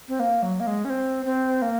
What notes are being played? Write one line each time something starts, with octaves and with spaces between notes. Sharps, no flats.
C4
A#3
F#3
A#3
G#3
C#4
C4
C4
A#3